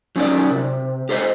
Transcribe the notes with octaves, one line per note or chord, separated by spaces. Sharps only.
F#3 C#4 D#4 A#4 D5
C3
G4 A4 C5 D#5